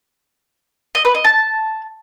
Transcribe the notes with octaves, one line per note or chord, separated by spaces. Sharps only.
D#5
B4
D#5
A5